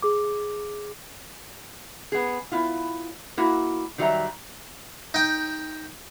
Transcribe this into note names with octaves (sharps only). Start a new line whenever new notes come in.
G#4 D6
B3 G#4
B3 E4 F4
A#3 E4 F#4
D#3 F#3 G3 G4 E5 A#5
D#4 G5